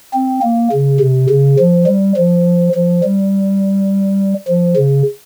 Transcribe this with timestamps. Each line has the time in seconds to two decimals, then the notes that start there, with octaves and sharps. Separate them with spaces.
0.14 C4
0.42 A#3
0.72 C#3
1.00 C3
1.29 C#3
1.59 F3
1.87 G3
2.16 F3
2.74 F3
3.04 G3
4.48 F3
4.76 C#3